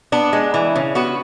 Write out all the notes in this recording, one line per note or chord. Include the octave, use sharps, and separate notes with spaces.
B3 D4
G#3
E3
C#3
B3 F#4